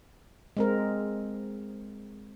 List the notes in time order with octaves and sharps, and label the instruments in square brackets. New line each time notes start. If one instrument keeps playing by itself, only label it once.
[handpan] G#3 C4 A#4